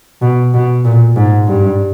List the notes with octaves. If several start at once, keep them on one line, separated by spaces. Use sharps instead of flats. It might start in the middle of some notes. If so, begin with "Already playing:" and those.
B2
B2
A#2
G#2
G2